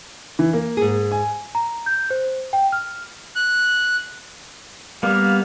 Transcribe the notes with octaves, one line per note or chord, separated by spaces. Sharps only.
E3
A#3
G#2 G#4
G#5
A#5
G6
C5
G5
F6
F#6
G3 A#3 B3 F5